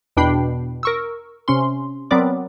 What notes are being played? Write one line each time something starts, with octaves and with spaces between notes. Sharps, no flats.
E2 B2 D4 G5 B5 C7
A#4 C#6 E6
C3 C#4 C6
F#3 B3 C4 A#4 D5 D6